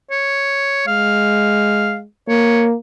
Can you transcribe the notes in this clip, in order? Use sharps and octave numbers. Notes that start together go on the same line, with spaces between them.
C#5
G#3 F5
A#3 C#5